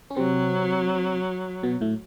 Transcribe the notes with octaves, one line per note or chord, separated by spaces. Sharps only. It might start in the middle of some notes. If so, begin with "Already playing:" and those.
C#4
C3 F#3 C4
B2 B3
A2 A3